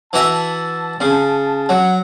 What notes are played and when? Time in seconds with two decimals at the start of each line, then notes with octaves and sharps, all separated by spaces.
0.13 E3 F#4 E5 A5
1.00 C#3
1.69 F#3 F#5